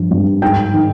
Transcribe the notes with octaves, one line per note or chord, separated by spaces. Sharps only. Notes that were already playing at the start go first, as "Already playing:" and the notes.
Already playing: G2 F3
G2
G#2 G5
D#3